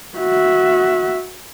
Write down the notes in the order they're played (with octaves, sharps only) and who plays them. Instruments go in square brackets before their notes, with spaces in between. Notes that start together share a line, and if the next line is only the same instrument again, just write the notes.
[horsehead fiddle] F#4 E5